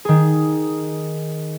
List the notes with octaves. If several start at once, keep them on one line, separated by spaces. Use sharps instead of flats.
D#3 G#4